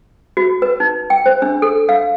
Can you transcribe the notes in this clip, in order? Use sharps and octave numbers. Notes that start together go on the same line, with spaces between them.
F#4
B4
D#4
G5
C5
D4
A4
F5